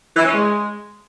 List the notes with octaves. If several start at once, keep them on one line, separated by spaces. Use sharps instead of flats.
E3
C#4
G#3